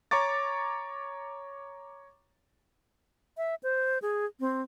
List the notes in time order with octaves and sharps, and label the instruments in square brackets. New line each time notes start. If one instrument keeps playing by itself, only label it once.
[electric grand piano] C#5 A#5 C#6 D6 A6
[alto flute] E5
C5
G#4
C4